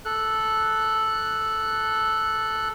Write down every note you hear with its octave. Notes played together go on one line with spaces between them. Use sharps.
A4 F#6